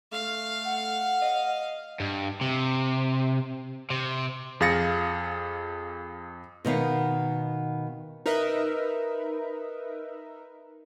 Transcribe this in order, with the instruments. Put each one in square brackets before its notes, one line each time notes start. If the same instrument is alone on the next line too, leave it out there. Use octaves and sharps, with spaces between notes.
[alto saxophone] A3 [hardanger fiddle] F5
[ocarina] F#5
[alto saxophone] D#5
[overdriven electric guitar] G2
C3
C3
[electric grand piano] F2 G#4 F5 A6 A#6 C#7
[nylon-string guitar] B2 D#3 B3 F5
[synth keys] D#4 A#4 B4 D#5 E5